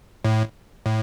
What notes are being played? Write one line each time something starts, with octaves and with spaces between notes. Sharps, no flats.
A2
A2